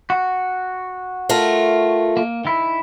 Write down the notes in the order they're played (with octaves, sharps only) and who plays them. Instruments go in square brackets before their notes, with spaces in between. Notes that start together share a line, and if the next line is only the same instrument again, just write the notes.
[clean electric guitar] F#4
[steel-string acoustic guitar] A3 F4 A#4
[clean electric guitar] A#3
D#3 E4